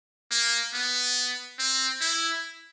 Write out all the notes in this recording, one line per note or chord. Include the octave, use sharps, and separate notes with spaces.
A#3
B3
C4
E4